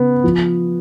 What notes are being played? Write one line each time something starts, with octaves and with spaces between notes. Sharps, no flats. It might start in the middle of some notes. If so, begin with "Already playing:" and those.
Already playing: C#3 B3
F3